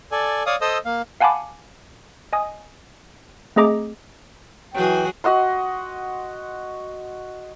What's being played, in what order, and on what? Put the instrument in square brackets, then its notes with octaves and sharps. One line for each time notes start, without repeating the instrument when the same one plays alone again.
[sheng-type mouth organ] A4 D5 G#5
C#5 D5 F5 D#6
A4 C5 D#5 D#6 E6
A#3 F5
[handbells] F5 F#5 G#5 A5 B5 D6
D#5 G#5 D#6
A3 C4 G#4 D#5 A#5 D6
[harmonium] E3 G5 [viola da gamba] F#3 F#4 G#4
[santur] F#4 D#5 F#5 C6